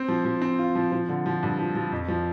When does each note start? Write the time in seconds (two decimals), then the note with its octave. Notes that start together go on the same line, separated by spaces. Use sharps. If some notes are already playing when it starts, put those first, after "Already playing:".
Already playing: C4
0.08 F3
0.25 F3
0.42 C4
0.59 F4
0.75 F3
0.92 F3
1.09 D3
1.26 F3
1.43 G2
1.59 F3
1.75 F3
1.92 F2
2.08 F3